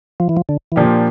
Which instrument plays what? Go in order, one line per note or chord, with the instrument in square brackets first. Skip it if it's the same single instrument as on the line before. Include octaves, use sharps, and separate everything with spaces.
[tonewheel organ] F3
E3
F3
D3
E3
[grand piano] A#2 F3 A#3 D4 G4 [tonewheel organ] D3